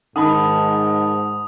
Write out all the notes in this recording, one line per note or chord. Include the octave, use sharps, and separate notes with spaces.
G#2 D#3 F#5 A5 B5 D#6